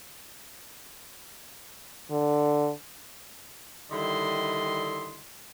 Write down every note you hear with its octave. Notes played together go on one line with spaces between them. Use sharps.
D3
D3 D#3 G3 E4 D#5 C6